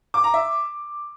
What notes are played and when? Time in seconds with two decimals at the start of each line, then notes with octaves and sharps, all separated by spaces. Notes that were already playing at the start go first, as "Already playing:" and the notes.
0.14 D6
0.24 A#5
0.34 E5